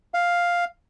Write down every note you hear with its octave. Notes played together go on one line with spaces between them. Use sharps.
F5